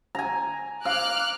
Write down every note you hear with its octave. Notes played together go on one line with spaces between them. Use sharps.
G#5 A#5
F5 D6 F6 F#6